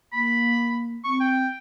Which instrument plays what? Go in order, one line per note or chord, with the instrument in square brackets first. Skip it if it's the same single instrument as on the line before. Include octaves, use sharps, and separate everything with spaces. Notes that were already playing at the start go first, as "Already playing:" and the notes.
[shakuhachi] A#3 [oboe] B5
[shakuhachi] C4 [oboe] C#6
[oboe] G5